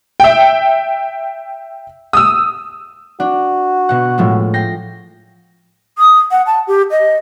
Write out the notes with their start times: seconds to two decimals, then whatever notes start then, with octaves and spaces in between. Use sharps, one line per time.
0.20 E5 G5
2.13 D#6 E6
3.20 D4 F#4
3.89 B2 F#5
4.18 A2 F3 G#3
4.54 G5 A#6 C7
5.98 D#6
6.31 F#5
6.46 A5
6.67 G4
6.91 D#5